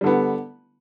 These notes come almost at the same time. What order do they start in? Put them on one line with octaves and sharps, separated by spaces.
G3 D3 B3